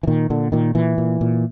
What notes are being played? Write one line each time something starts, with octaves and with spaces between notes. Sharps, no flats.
E3
A#2 D#3
A#2 D3
A#2 D#3
A#2 E3
A#2
A#2